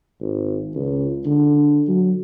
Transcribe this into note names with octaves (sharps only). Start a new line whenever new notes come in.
G#1
C#2
D3
F#3